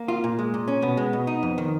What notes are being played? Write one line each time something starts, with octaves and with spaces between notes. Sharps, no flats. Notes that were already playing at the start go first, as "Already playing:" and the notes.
Already playing: A#3
F4
A#2
G#3
A#2
C#4
B2 B3
G#3
B2
D#4
F2
D#3